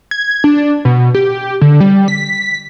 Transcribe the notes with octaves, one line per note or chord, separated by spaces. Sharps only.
G#6
D4
B2
G4
D3
G3
B6